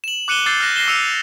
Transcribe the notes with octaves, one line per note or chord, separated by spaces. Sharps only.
E7 F#7
D6 F#6 C#7 D#7 E7 G7
D6 E6 G6 A6 C7 G7
F6 F#6 A#6 E7
A#6 C7 E7 G7
D6 E6 C#7 D#7 F7